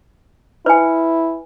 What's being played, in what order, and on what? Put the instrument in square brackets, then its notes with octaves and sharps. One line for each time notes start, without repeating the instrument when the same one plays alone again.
[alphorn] E4 [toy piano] B4 G#5